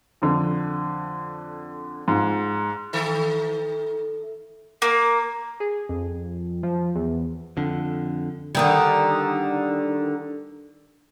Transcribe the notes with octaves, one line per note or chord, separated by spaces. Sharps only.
F2 D3
G#2 F4
D#3 A4 E5
A#3
G#4
F2
F3
E2
F2 D3
D3 D#3 G3